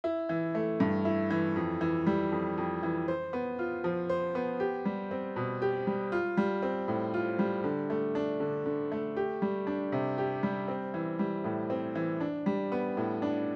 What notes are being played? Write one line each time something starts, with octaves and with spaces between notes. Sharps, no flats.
E4
E3
A3
G2
E4
E3
F2
E3
G3
F2
F2
E3
C5
B3
F4
F3
C5
B3
G4
G3
C4
B2
G4
G3
F4
G3
C4
A2
F4
G3
D3
A3
D4
D3
D3
A3
G4
G3
D4
C3
G4
G3
C4
E3
G3
A2
C4
E3
D4
G3
B3
A2
D4